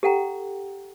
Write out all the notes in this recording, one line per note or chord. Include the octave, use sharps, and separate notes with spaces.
G4 A4 F#5 G5 A#5